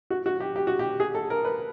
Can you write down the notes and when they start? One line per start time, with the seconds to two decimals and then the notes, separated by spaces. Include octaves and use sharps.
0.10 F#4
0.26 F#4
0.40 G4
0.56 G4
0.67 F#4
0.79 G4
1.00 G#4
1.15 A4
1.30 A#4
1.45 B4